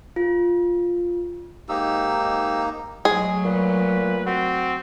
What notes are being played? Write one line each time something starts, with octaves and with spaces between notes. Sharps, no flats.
F4
G#2 A#3 D#4 G4 E6
F#3 G#3 A3 G#4
A#2 B4
C4 F#4